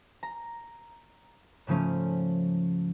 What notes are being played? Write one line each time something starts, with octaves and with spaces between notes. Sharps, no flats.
A#5
G#2 C#3 F3 A3 C#4